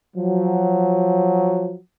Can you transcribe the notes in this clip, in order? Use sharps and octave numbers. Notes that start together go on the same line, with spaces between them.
F3 F#3